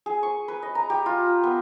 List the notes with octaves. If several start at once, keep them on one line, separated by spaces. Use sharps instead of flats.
G#4
C#6
B4
D#5
A#5
G4
F4
B3